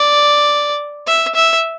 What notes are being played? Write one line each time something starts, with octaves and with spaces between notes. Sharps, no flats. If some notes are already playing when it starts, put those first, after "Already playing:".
Already playing: D5
E5
E5